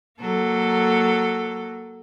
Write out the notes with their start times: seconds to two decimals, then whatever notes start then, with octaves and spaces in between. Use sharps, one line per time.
0.21 F#3 A#3 A4